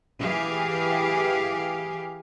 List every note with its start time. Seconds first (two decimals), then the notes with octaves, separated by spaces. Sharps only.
0.21 E3 G4 G#4 F5